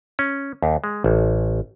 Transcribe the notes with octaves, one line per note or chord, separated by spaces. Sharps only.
C#4
D#2
G#3
A1